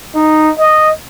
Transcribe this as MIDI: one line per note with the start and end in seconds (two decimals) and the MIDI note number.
0.15 0.50 63
0.59 0.89 75